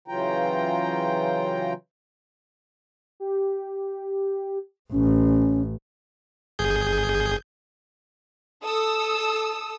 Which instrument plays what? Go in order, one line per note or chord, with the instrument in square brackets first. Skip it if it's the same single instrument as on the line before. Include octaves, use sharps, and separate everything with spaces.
[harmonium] C#3 E3 F#3 F4 G5 A#5
[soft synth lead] G4
[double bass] A1 [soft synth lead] C#4
[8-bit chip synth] G1 G#4 G6
[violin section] A4 D#6 E6